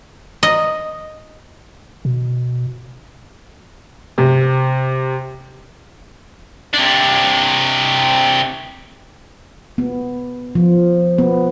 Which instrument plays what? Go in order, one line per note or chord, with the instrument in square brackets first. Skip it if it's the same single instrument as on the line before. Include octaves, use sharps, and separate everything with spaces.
[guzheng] D#5
[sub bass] B2
[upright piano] C3
[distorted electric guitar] C3 D4
[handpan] B3
F3
B3